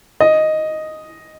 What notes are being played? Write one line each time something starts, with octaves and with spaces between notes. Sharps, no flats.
D#5